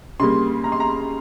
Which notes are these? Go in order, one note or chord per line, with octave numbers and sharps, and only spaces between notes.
C#3 G3 A#3 C6
A#5
C6
A#5